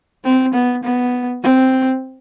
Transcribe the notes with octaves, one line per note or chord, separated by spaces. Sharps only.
C4
B3
B3
C4